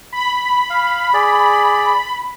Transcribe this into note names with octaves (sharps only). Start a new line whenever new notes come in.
B5
F5
G#4 D5